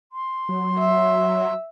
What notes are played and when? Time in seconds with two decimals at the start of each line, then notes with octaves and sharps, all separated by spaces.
0.12 C6
0.49 F#3
0.79 E5